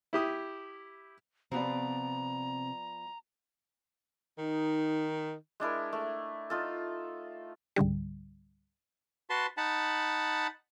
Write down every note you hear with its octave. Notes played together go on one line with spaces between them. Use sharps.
E4 G4 D#6
C3 F3 B3 C4 D5 A#5
D#3 D#4
G#3 D4 E4 A#4
A3
D#4 F4 A4
C#2 G#2 D3 G3
F#4 B4 A5 C6
D#4 F#5 A5 B5